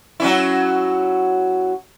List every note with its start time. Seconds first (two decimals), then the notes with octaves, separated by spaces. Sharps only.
0.20 F#3 C#4 E4